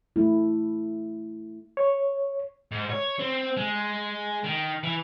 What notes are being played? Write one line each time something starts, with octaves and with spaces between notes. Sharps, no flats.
A3 E4
C#5
G#2
C#5
C4
G#3
D#3
E3